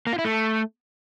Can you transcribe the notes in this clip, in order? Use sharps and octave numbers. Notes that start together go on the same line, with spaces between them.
A#3
F4
E4
A3